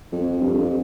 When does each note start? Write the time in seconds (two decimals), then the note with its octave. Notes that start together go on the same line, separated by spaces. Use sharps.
0.13 F2
0.41 G2
0.54 F2